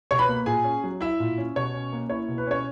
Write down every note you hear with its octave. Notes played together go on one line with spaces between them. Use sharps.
B2 C#5 C#6
B4 B5
A#3
A#2 G#4 G#5
C#4
F#3
E4 E5
A#2
C#4
B2 C#5
C#4
A#3
E4 C#5
B2
B4
C#4 C#5